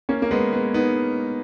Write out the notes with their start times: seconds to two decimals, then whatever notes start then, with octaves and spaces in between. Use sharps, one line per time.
0.09 A#3 C#4
0.22 A#3
0.31 G#3 B3
0.52 G#3 B3
0.74 B3 D#4